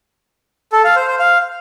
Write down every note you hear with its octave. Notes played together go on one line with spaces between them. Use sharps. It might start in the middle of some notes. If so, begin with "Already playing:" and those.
A4
F5
C5
C5
F5